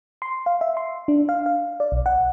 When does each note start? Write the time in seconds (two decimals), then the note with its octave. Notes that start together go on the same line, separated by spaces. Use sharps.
0.22 C6
0.46 F5
0.61 E5
0.77 C6
1.08 D4
1.29 F5
1.46 F5
1.80 D5
1.92 B1
2.06 F#5